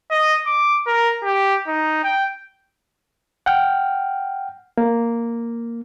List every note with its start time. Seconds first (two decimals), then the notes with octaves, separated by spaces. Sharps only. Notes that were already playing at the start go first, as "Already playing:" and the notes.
0.11 D#5
0.46 D6
0.87 A#4
1.24 G4
1.68 D#4
2.04 G5
3.46 F#5 G5 F6
4.78 A#3